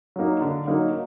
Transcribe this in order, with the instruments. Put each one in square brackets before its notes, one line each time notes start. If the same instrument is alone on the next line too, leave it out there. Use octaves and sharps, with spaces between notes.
[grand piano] F#3 A#3 D#4
D3
F#3 A#3 D#4